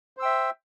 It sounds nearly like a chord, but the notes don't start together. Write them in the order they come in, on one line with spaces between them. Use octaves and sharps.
C5 E6 G5 E5